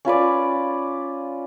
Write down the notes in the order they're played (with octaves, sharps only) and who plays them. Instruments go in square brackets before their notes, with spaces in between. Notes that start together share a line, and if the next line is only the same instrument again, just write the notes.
[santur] C#4 F4 B4 D5